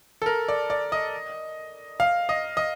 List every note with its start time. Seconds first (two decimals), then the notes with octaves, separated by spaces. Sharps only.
0.22 A4
0.26 A#4
0.48 D5
0.70 D5
0.92 D#5
2.00 F5
2.29 D#5
2.57 D#5